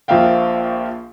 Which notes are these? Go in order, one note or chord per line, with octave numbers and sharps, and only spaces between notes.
A#1 F3 A#3 E5 F5 G5